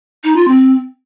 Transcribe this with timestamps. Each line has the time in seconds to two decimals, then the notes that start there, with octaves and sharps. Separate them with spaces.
0.24 D#4
0.36 F4
0.48 C4